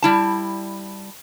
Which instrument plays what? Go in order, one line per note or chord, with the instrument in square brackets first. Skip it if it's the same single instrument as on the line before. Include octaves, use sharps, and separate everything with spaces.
[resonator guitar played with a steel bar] G3 E4 A5